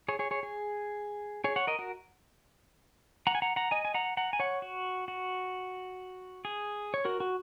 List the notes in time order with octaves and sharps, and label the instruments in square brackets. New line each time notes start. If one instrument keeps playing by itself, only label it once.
[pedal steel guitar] G#4 C#5
G#4 C#5
G#4 C#5
G#4
G#4 C#5
C#5 F#5
A#4 D#5
F#4 A#4
F#5 A#5
G#5
F#5 A#5
F#5 A#5
D#5 G#5
G#5
F#5 A#5
F#5 A#5
G#5
C#5 F#5
F#4
F#4
G#4
C#5
F#4 A#4
F#4